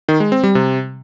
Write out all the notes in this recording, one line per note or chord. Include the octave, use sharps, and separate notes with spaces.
D#3
G#3
C4
G3
C3